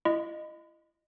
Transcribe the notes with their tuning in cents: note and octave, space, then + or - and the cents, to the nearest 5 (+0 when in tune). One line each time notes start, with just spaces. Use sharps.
E4 +35 D#5 -15